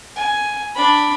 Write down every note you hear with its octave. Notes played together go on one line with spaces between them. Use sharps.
G#5
D4 B5